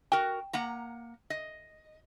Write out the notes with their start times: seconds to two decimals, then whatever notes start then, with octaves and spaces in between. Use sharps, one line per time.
0.12 F#4 A#4 G5
0.53 A#3 F#5 A#5
1.30 D#5